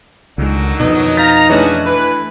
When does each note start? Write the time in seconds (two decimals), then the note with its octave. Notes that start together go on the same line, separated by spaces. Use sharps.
0.38 C#2 D3 D#3 F#3 G#3
0.80 F2 B2 D#4
1.17 F5 A#5 G6 A6 B6
1.50 E3 G#3 A3 C#4 D4 F#4
1.86 E4 B4